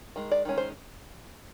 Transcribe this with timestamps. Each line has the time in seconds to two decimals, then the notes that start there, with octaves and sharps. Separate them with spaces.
0.16 D#3 G#3
0.32 D5
0.45 D#3 G#3 C#4
0.58 C5